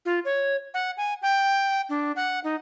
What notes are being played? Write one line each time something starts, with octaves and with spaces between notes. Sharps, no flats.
F4
C#5
F#5
G#5
G5
D4
F#5
D#4